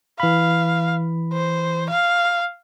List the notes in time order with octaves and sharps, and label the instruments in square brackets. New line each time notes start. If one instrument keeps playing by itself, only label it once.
[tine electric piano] E3 B5 [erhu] F5
[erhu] C5
F5